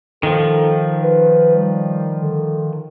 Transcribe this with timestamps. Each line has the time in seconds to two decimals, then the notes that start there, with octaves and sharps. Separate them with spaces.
0.23 D#3 F3 A4
1.03 B4
1.55 G3
2.21 D3